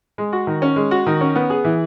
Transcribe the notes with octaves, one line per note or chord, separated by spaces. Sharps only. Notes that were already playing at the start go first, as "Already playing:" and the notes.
G#3
F#4
D#3
C#4
G#3
F#4
D#3
C#4
B3
G#4
E3